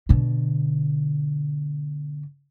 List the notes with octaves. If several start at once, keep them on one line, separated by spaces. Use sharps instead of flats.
B2 D3